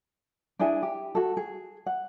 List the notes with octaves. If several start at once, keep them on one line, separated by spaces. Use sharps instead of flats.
D4 E4 G#4 G#5
G4
F#4 A4
G#4
F#5